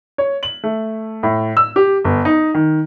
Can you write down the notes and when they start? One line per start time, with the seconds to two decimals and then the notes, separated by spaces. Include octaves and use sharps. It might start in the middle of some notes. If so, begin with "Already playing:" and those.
0.18 C#5
0.43 F#7
0.64 A3
1.23 A2
1.57 E6
1.76 G4
2.05 G1
2.25 D#4
2.54 D#3